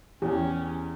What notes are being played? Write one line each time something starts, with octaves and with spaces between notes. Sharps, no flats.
E2 C#4 G4 C#5